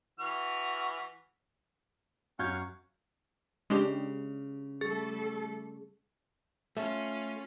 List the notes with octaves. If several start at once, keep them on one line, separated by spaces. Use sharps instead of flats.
E3 F#4 F6
F#2 C#4 F5 F#5 G6 G#6
C#3 G#3 D4 G4
G3 A3 G#4 A4
A3 C#4 F4